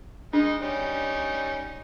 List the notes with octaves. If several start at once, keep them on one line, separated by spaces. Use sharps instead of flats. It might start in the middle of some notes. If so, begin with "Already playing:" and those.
G#3 D4 D#4
G3 C#4 D#4